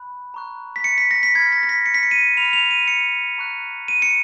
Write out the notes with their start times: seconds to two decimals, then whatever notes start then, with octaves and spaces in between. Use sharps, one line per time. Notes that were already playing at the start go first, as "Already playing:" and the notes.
Already playing: B5 F#6
0.34 A#5 C#6 F#6
0.76 B6
0.84 C#7
0.98 B6
1.11 A#6
1.23 B6
1.35 B5 G#6
1.39 F6
1.52 A#6
1.63 A#6
1.69 B6
1.86 C#7
1.94 B6
2.03 C#7
2.11 D#7
2.37 B5 F6 F7
2.53 F7
2.71 D#7
2.88 C#7
3.38 A#5 C#6 F#6
3.88 D#7
4.02 C#7